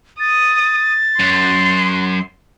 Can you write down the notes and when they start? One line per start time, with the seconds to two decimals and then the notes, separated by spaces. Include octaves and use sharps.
0.20 D#6 A6
1.19 F#2 C6